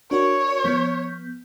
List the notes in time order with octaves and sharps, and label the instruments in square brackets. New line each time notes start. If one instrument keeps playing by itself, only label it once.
[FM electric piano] D4 F#4 A#4 [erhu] C#5
[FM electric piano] F3 B3 G6